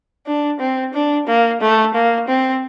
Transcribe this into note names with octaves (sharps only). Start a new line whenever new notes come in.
D4
C4
D4
A#3
A3
A#3
C4